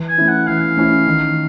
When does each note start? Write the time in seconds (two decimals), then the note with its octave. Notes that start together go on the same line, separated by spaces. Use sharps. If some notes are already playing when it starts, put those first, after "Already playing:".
Already playing: E3
0.09 G#5
0.18 A3 C#4 E4
0.28 F#5
0.47 E3 F5
0.77 A3 C#4 E4
1.07 D#3